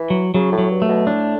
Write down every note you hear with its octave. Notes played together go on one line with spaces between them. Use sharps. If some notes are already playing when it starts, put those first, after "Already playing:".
Already playing: E3
F#3
C#3 F#3
A2
F#3
G2
A3
B2
A2 D4